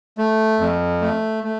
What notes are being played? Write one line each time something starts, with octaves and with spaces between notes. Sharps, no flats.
A3
F2
A3
A3